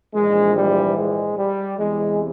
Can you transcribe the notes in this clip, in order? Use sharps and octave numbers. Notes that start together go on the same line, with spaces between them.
A#1 G#2 E3 G#3
G3
G#3
G3
E2 C3 E3 G#3